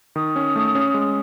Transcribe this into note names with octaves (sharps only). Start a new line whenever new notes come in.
D#3 D#6
C#4
A3
C#4
G#3